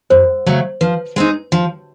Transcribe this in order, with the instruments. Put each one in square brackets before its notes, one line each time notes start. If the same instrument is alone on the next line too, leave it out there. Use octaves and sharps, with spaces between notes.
[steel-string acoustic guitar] F#2 [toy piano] C5
[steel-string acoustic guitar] C#3 F#3 A3
[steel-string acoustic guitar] F3 [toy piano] B4
[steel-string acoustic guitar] G#3 C4 D#4
F3